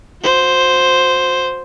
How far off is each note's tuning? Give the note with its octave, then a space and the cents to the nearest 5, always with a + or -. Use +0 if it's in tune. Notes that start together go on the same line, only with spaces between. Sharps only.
F#4 -35 C5 +0